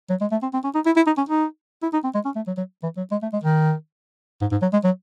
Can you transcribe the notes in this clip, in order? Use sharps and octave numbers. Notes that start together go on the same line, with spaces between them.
F#3
G#3
A3
C4
C4
C#4
D#4
E4
E4
D#4
C#4
D#4
E4
D#4
C4
G#3
C#4
A3
F#3
F#3
E3
F#3
G#3
A3
G#3
D#3
G#2
G#2
F#3
G#3
F#3